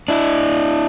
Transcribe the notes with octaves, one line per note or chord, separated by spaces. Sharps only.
D4 E4